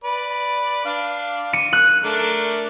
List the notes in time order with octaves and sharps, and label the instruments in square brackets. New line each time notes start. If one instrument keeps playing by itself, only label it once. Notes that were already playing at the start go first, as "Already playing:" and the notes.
[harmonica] B4 D5
D4 F5
[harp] C#7 D#7
F#6
[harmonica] A3 D4 A#4